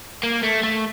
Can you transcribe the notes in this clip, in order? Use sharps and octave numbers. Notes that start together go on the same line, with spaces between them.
A#3
A3
A3